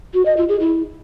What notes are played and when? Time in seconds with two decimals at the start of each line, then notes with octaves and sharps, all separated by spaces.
0.14 F#4
0.26 D#5
0.37 F4
0.49 G#4
0.60 E4